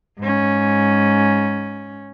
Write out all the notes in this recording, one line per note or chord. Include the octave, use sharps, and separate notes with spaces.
G#2 C#4